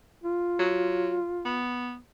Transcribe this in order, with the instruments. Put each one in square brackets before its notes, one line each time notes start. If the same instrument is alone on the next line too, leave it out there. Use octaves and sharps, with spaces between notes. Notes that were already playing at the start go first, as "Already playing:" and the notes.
[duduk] F4
[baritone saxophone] F#3
B3